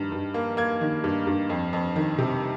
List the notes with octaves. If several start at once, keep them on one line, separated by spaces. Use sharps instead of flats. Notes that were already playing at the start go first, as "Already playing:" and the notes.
Already playing: G2 D#3
G2
A#3
A#3 G#6
D#3
G2
G2
F2
F2
D#3
C3